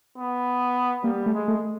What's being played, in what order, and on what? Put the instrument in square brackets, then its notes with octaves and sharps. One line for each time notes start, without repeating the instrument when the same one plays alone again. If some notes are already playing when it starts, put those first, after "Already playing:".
[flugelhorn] B3
[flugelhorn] G3 [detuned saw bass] A#3
[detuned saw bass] A3
[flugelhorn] G#3
[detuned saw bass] A3